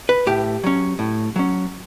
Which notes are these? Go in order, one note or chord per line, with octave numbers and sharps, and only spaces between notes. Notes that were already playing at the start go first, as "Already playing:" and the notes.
B4
A2 G4
F#3 C#4
A2
F#3 C#4